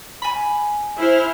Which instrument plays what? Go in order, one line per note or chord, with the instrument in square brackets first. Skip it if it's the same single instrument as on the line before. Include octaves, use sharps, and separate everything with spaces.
[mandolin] G#5 B5
[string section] E4 C5 F6